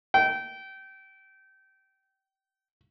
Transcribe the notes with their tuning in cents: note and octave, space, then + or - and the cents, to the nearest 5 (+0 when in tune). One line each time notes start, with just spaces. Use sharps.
G5 -25